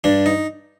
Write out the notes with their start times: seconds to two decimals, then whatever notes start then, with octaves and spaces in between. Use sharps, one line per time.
0.04 G2 D4
0.26 D#4